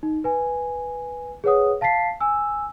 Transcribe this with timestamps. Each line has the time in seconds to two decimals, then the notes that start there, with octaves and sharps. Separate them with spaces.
0.03 D#4
0.24 B4 G#5
1.44 G#4 B4 C#5 F#5 D#6
1.81 F5 A5 A6 B6 C7
2.20 G#5 E6